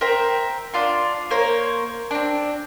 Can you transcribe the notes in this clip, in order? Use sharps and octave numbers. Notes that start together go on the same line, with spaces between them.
A#4 C5 E5 G5
D4 F4 C6
A#3 A#4 C5 C#5
C4 D4